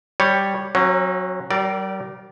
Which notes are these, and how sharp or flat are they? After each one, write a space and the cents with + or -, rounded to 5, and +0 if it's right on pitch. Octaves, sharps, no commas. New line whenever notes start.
G3 +0 C#5 -5
F#3 -5 C#4 -45
G3 -35 A#4 +0 D5 +0